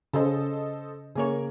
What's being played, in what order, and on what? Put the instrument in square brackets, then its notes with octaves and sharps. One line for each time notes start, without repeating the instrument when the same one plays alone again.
[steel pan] C#3 [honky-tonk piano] A4 C5 D#5
[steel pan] C#3 A#3 C#5 [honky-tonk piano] G#4 A#4